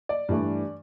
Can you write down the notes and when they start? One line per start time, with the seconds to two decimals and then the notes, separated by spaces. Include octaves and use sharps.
0.09 D5
0.29 G2 E3 A3